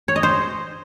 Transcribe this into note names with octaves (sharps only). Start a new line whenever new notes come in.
C#5
D#5
C5